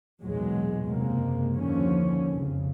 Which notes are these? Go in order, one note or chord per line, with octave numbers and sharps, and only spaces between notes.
B1 E2 A#2 F#3 G#3
F#1 C3 G#3 A#3
D#2 D3 F3 C#4
C2 F2 C#3